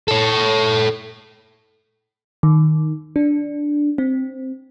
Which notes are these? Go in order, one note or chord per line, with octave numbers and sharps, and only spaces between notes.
A4 C#5
D#3
D4
C4